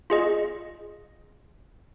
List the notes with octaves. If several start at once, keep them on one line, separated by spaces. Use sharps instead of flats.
F4 G#4 D#5